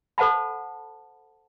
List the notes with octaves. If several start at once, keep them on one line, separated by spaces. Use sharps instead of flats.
A4 C5 F#5 A5 B5